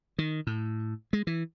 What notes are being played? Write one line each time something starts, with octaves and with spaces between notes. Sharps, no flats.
D#3
A2
G#3
E3